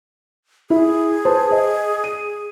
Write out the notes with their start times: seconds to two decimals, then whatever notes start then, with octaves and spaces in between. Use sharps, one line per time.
0.70 E4 G#4
1.25 B4 C5 A5
1.51 D#5
2.04 D#7